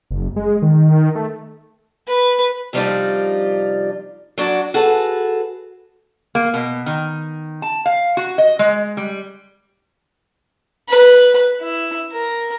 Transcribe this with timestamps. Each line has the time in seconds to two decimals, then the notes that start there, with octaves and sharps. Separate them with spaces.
0.11 F#1
0.36 G#3
0.62 D#3
1.15 A3
2.07 B4
2.73 C3 F3 G3 D4 D#4 F4
4.38 F#3 D4 F#4
4.74 F#4 G#4 A4 B4
6.35 A#3
6.54 B2
6.86 D#3
7.62 A5
7.86 F5
8.17 F#4
8.38 D#5
8.59 G#3
8.97 G3
10.89 B4
11.60 E4
12.13 A#4